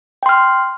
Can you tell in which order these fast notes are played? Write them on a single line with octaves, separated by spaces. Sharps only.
G5 C6 F6